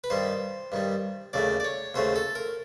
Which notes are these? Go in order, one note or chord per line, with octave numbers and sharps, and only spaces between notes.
B4
G2 D#3 G3 C5
G2 D#3 G3
D#2 C#3 F#3 A3 D5
D5
C#5
D#2 C#3 F#3 A3 C5
A4
A#4